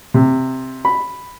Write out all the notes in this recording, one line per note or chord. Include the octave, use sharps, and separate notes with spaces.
C3
B5